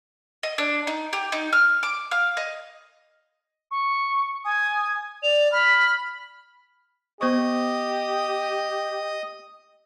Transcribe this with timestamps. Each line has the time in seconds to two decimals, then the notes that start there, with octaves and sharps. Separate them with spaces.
0.43 D#5
0.58 D4
0.87 D#4
1.13 G4
1.32 D#4
1.53 F6
1.83 D6
2.11 F5
2.37 D#5
3.71 C#6
4.45 G#5 D#6
5.23 D5 F7
5.52 B5 F6
7.21 B3 G4 C5 D#5 C#6 D#6